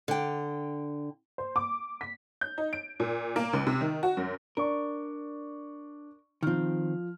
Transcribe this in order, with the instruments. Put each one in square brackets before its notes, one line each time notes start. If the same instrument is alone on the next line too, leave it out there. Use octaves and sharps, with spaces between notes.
[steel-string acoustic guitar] D3 G5
[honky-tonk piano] C5
D6
B6
G6
D#4
D7
A#2
A#3
C#2
C3
D#3
F#4
F#2
[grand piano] D4 D5 C#6 [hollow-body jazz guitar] A#4
[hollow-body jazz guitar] D#3 C4 [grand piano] F3 F6